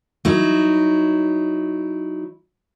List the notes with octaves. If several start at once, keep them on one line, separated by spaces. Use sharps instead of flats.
F#3 D#4 E4